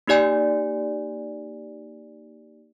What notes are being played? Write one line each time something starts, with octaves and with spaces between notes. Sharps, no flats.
A#3 D#4 G4 D5 G#5